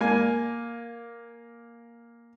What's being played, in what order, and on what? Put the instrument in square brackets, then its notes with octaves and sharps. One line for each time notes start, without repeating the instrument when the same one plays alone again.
[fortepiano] A#3 G#5